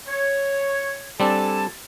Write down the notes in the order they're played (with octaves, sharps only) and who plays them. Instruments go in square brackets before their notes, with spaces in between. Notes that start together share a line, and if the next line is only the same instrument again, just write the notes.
[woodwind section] C#5
[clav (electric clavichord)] G3 C4 D4 [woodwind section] A4 G#5 A5